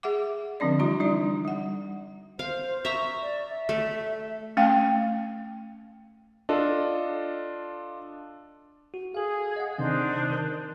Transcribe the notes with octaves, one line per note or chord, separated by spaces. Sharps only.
G#4 E5 F#5 D6
D3 F3 C4 D4 D5
E3 G3 E4 F#4 A#5
G3 D4 D#4 D5
G3 F#5
C5 F5
E5 A#5 C#6
D5
E5
A3
A3 C#4 F5 G5
D4 F4 A4 D#5
F#4
G#4 A4 F5
D#5 F#5
C3 D#3 C4 D4 D#4 C5
D#3 A#4 A5